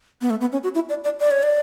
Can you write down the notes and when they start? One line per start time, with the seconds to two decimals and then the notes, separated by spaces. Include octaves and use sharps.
0.22 B3
0.30 A3
0.41 B3
0.52 C#4
0.64 F#4
0.75 E4
0.89 D5
1.04 D5
1.20 D5
1.31 C#5
1.43 D5